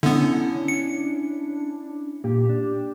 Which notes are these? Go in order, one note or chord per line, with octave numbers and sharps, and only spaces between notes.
D3 B3 C#4 D4 E4
C#7
A#2 G4
D4